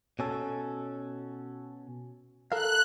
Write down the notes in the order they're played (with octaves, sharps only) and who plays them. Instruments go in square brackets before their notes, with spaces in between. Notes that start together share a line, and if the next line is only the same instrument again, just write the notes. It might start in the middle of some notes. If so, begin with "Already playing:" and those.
[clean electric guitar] B2 C#4 A4
[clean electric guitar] A4 A#4 F5 [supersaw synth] F#6